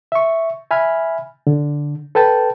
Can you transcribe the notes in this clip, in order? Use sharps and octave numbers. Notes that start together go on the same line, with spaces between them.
E5 C#6
E5 G#5 B5 F6
D3
A4 B4 G5 A5